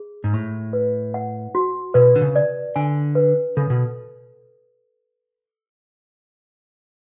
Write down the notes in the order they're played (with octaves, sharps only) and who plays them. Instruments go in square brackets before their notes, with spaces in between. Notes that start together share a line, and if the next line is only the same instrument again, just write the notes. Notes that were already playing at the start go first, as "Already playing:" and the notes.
Already playing: [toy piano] G#4
[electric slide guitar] G#2
[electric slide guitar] A2 [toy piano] C#6
[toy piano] B4
F#5
F#4
[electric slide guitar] B2 [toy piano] B4
[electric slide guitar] D3
C#3
[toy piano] D5
[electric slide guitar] D3 [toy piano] G#5
[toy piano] B4
[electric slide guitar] C#3 [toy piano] A4
[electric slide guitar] B2